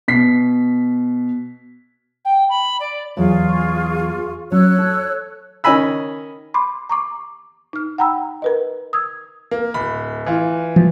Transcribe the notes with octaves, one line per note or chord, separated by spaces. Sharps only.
B2 B6 C7
G5
B5
D5
E2 F#3 F4 G#4 D5 C#6
F#3 C#4 C#5 E6 F#6
A4
D#3 C#4 D#5 G#5 B5 E6
B5 C6 D6
A#5 C#6 D6
D#4 F6
F#5 G5 A#5 B5 E6
A#4 B4 D#5
D#6 E6 G#6
A#3
D1 B5
E3 F4
F3 G3